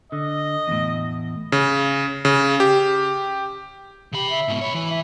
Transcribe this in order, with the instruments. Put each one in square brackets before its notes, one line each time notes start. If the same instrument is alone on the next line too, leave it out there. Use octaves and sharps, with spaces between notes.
[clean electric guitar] D3 [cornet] D#5
[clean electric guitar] E2 A2
[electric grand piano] C#3
C#3
G4
[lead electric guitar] C#3 B5 [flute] G4
[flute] E5
[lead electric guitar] G#2 B2
[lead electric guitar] C2 C#5 [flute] B5
[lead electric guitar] E3
[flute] E5